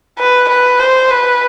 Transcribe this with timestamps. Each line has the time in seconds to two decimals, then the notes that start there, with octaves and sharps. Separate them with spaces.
0.19 B4
0.49 B4
0.80 C5
1.10 B4